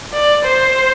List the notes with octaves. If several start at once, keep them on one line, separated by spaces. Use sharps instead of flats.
D5
C5